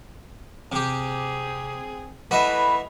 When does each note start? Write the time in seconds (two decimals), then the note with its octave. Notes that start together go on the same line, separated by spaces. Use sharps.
0.72 C3 C4 G4 G#4
2.31 E3 A3 F#4 B4 D#5 E5